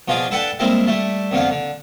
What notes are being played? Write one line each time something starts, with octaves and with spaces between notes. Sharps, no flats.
B2 F3 F4 G#4 D5 D6
D4 A4 B4 F#5 G5 A5
G3 G#3 A#3 C4 E4
G3 A3 E4
F2 D3 B3 F5
D3